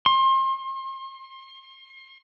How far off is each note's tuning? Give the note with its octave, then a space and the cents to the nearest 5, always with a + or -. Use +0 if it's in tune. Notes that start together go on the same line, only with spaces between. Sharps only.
C6 +35